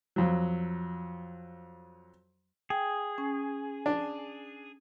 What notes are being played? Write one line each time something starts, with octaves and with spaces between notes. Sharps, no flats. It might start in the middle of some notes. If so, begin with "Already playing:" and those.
F2 F#3
G#4 G5
C#4
D4